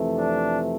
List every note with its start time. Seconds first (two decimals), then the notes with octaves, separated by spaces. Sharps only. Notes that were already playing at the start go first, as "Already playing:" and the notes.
Already playing: F2 C3 E3 A3
0.17 D4